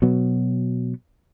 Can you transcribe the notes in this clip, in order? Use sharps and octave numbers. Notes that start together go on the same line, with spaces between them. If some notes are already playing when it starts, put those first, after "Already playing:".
B2 F#3 B3